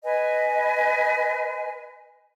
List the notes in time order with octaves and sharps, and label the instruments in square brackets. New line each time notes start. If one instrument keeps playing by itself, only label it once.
[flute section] B4 D#5 G#5